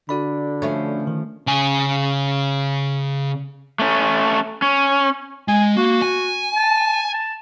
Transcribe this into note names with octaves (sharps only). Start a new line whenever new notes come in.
D3 F#4 D5 B5
F3 A3 C#4
D#3
C#3 G#5
A3 C#4
C#4
G#3 G#5
A#3 F#4
G#5
A5
A5